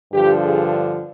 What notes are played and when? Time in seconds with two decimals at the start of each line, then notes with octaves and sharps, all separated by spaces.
0.12 G2 D3 F3 G4
0.41 G#4